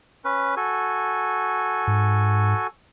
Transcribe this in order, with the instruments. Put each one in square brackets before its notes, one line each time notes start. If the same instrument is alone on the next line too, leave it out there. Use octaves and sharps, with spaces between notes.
[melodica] C#4 B4
F#4 A4 G#5
[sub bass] G#2